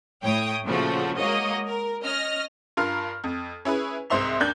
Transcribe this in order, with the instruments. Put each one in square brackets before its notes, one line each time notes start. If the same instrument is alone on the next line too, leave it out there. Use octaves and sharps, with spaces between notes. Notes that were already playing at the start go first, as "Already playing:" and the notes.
[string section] A2 C#5 G5 D#6
A#2 C#3 F3 A3 F#4
G#3 A#3 F#4 C#5 D#5
A#4
C#4 D#5 F6 A#6
[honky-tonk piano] G2 F4 A#4 F6
F2
C#4 E4 G#4 B4
C2 G#2 C5 E5 C6 F7
D#2 D4 G6